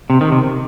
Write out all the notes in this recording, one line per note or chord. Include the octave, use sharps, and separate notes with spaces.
C3
D#3
C3